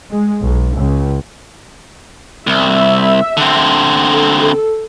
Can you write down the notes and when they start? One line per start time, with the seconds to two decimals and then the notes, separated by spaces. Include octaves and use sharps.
0.11 G#3
0.43 B1
0.76 C#2
2.47 C2 E5
3.37 D3 C4
4.14 A4